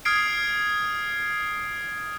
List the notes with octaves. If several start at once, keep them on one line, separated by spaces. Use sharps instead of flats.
D#6 F6 G#6 C7 D7